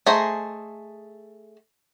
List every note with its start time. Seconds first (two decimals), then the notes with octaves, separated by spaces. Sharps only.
0.06 A3 G#4 C5 D#5 A#5